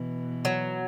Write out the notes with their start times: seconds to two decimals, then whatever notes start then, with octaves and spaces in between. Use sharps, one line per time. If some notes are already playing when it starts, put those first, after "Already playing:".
Already playing: B2 E3
0.45 F#3